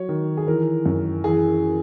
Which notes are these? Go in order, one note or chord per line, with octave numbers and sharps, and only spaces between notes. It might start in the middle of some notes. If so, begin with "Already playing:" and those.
Already playing: F#3 C#5
D#3
G#4
E3 A#4
F#2
E3 G#4